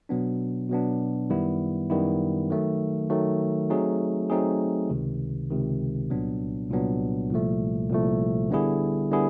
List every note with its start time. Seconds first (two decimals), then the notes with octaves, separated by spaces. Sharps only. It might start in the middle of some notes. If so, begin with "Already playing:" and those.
0.09 B2 F#3 B3 D4
0.70 B2 F#3 B3 D4
1.30 F#2 D#3 G3 B3 E4
1.90 F#2 D#3 G3 B3 E4
2.50 D#3 F#3 A3
3.10 D#3 F#3 A3
3.70 F#3 A3 C4 D#4 G#4
4.30 F#3 A3 C4 D#4 G#4
4.90 C#2 C3 D#3
5.51 C#2 C3 D#3
6.10 C2 A#2 F#3 B3 D4
6.70 C2 A#2 F#3 B3 D4
7.31 C2 A#2 F3 A3
7.90 C2 A#2 F3 A3
8.50 D3 G3 B3 E4 G#4
9.11 D3 G3 B3 E4 G#4